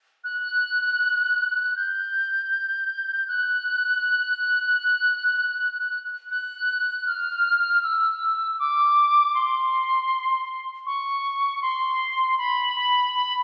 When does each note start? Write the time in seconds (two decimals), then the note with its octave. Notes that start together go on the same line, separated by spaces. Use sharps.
0.24 F#6
1.76 G6
3.28 F#6
6.31 F#6
7.07 F6
7.83 E6
8.59 D6
9.35 C6
10.86 C#6
11.62 C6
12.38 B5
12.75 B5
13.14 B5